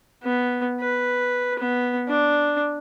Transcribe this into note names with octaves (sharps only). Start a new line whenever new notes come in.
B3
B4
B3
D4